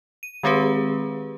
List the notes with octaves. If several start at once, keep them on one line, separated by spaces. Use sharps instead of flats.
D#7
D#3 G#3 C4 G4 G#4 B4